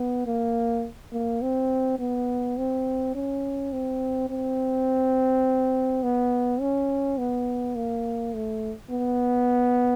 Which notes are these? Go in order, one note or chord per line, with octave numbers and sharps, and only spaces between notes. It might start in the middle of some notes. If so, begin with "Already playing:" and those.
Already playing: B3
A#3
A#3
C4
B3
C4
C#4
C4
C4
B3
C#4
B3
A#3
A3
B3